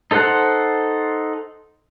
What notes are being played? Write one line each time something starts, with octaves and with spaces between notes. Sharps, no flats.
D#4 A4 C5 F#5 F#6